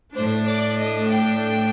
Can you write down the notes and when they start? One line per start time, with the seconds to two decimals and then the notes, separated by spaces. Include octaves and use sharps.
0.15 A2 A3 D4 C5
0.46 D5
0.77 D#5
1.09 G5